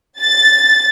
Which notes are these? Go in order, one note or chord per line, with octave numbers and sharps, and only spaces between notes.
A6